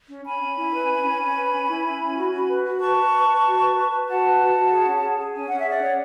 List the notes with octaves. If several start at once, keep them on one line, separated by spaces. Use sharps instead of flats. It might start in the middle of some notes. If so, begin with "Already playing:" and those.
C#4
C#4 G#5 B5
C#4
E4
B4
C#4
C#4
C#4
B4
C#4
E4
E4
C#4
F#4
F#4
B4
F#4
B4 A5 C#6
B4
B4
B4
F#4
B4
B4
B4
F#4 F#5 A5
B4
F#4
F#4
G#4
C#4
G#4
G#4
C#4 G#5
C#4 F#5
E5
G#4 D5 F#5
C#5